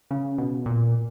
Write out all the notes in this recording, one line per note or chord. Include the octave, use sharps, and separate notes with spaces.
C#3
B2
A#2